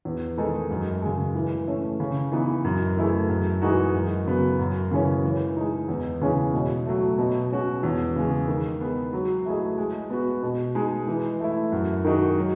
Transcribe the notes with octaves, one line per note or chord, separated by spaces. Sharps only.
E2
D#3 G#3 D#4 A4
F#2
C#3 G#3
E3
A3 C#4
C#3
E3 B3 D#4
F#2
E3 A3 E4 G#4
F#2
E3 G#3 D#4 F#4
F#2
C#3 F#3 B3
F#2
C#3 E3 G#3 C#4
E3
G#3 D#4
E2
C#3 E3 G#3 C#4
B2
F#3 A3
B2
G#3 C#4 F#4
E2
C#3 G#3
D#3
G#3 B3
F#3
A3 E4 G#4 D#5
G#3
B3 F#4
B2
G#3 D#4
E3
A3 E4
F#2
D#3 G#3 D#4 F#4
F#3